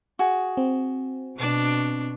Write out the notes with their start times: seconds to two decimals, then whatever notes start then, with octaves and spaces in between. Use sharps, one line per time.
0.19 F#4 G#4
0.57 C4
1.37 B2 D4